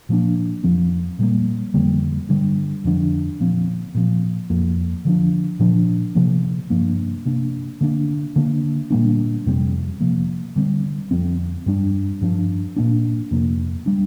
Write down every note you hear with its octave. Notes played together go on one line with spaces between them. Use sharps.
A#2 F3 A#3 D4
F2 F3 C4
A#2 G3 A#3
F2 D3 G3 A#3
G2 D3 G3
F2 D3 F3 D4
A#2 F3 C4
A#2 F3 C4
F2 F3 A#3
D3 F3 D4
A#2 F3 D4
C3 F3 A#3
G2 F3 A#3 D4
C3 A#3 D4
D3 A#3 D4
D3 A#3 D4
A#2 G3 A#3 D4
F2 C3 G3 C4
C3 F3 A#3
D3 G3 C4
F2 F3 C4
G2 G3 D4
G2 F3 D4
A#2 A#3 D4
F2 C3 A#3
G3 D4